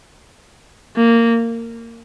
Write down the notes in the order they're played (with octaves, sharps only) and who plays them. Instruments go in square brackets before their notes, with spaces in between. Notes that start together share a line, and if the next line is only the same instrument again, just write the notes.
[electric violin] A#3